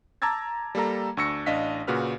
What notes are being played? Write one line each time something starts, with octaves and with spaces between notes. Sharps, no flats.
A5 A#5 D6 E6 G#6 A6
G3 A#3 A4 A#5
D2 D4 C#6 E6 A#6 C#7
A1 D4 D#5 F5 B6
A#2 C#3 F#4 B4 F6